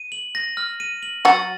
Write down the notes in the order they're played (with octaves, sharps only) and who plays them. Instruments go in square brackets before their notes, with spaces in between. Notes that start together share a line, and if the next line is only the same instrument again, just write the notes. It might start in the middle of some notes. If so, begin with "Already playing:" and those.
Already playing: [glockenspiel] D#7
F#7
A#6
F6
D#7
F#7
[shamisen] F#3 F#4 [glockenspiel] A6